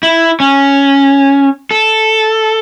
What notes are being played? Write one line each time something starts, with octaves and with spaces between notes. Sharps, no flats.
E4
C#4
A4